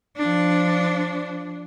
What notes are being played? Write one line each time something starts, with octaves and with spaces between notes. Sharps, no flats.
F3 D4